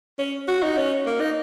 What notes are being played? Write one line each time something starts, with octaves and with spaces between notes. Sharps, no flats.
C#4
F#4
D#4
C#4
A#3
D#4